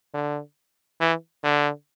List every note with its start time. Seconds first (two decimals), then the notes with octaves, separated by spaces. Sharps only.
0.14 D3
1.01 E3
1.44 D3